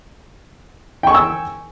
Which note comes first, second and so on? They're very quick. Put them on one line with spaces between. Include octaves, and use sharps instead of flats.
G5 C#6 G#5 E6